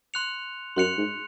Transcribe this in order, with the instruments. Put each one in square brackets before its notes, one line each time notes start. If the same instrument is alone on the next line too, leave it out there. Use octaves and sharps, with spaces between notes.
[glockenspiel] C6 F#6 C#7 F7
[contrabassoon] F#2 [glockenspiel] C6 F#6 C#7 F7
[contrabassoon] G#2